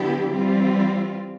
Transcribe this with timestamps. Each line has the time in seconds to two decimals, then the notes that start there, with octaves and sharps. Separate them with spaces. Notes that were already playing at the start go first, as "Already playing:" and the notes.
Already playing: D3 F#3 B3 E4 G4
0.32 E3 G3 C4 F4